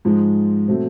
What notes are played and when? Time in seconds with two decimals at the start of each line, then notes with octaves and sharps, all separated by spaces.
0.05 G#2 F3 G#3
0.68 B2 F#3 A3 C4